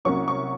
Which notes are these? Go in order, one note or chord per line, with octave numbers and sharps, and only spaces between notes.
C2 C3 F#3 A#3 C#4 C#6
C#6